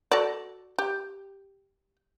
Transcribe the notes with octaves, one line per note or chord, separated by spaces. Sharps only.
F#4 A4 D5
G4